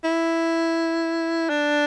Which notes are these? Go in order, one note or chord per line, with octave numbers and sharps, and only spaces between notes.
E4
D4